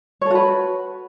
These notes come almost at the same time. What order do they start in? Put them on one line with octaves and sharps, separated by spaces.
C#5 A4 F#4 B4